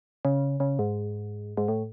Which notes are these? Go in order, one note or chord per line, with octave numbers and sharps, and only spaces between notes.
C#3
C#3
G#2
G#2
A2